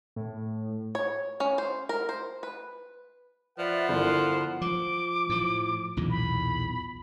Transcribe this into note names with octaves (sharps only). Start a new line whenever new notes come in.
A2
C#5
C#4
C5
A#4
C5
B4
F3 B4 D5 E5 F#5
G1 E4 A#4 C6
F3 D6
A2 F3
B1 E2 A#2
B5